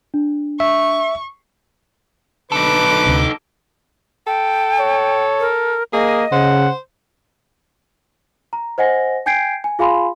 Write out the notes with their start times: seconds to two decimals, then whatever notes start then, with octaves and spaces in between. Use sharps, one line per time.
0.14 D4
0.60 E5 C#6
2.52 B1 D3 D#4 A4 B4 D6
3.06 D2 C3
4.27 A4 G5
4.79 C#5
5.40 A#4
5.93 A#3 G#4 D#5
6.32 C#3 C5 F#5
8.53 A#5
8.78 C5 D#5 F#5 G#5 A#6
9.26 G5 G#5 G6 G#6 C7 D7
9.64 G#5
9.79 F4 G#4 F5 G#5 B5 C6